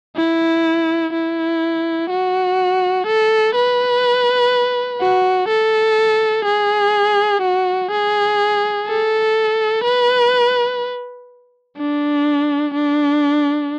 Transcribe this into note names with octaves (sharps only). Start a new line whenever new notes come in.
E4
E4
F#4
A4
B4
F#4
A4
G#4
F#4
G#4
A4
B4
D4
D4